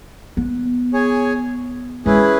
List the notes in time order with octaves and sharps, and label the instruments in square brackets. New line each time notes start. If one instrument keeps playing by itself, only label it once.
[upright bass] B3
[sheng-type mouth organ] G#4 C#5 G#5
[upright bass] G#3 [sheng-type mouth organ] C#4 E4 G#4 B4